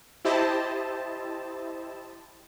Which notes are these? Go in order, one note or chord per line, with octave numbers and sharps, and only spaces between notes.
E4 G4 C5 D#5 A5